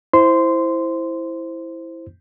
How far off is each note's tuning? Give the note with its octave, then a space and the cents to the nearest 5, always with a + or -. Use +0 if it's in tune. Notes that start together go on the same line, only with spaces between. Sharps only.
E4 +0 C5 +0 C6 -15